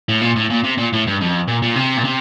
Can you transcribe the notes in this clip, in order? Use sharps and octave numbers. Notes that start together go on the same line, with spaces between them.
A2
A#2
A2
A#2
C3
A#2
A2
G2
F2
A#2
A#2
C3
A#2
C3